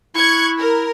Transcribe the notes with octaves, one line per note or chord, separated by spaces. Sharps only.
E4 C#6 F#6 G#6
A#4